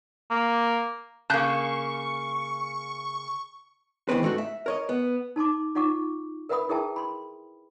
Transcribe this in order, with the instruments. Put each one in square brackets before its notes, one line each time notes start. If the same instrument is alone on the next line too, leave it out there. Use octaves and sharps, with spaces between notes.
[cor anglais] A#3
[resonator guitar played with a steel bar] C#3 A#3 [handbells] A5 F#6 G6 [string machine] C#6
[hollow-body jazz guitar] C#2 D#3 E3 B3 C4 B4
G#2 A3 D#4 F#4
E5
A#4 C#5 D#5
B3
[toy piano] D#4 A5 C6 D6
D#4 F4 F#5 C#6 D6
A#4 B4 E5 F#5 B5 D#6
E4 G#4 A#4 E5 G5 A5
B5 C6